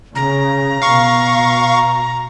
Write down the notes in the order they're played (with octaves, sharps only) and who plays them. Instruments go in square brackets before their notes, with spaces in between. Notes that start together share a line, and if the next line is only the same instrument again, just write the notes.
[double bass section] C#3 [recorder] A#5
[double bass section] B2 [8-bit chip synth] F5 C#6